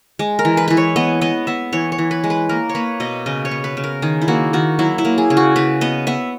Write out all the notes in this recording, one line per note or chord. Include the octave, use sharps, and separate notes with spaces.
G#3
A#4
E3
B4
E3 B4
C#5
B3 D#5
B3 D#5
B3 E5
E3 C#5
C#5
E3
B4
G#3
B4
A#3 A#4
C#5
A#3 B4
B2 D#5
C#3 D#5
C#5
B3
B4
C#3
A#4
D#3 G#4
E4
A#3 F#4
D#3 F#4
F#3 E4
E4
A#3
G#4
C#3
F#4
C#3 B4
B3 D#5
B3 E5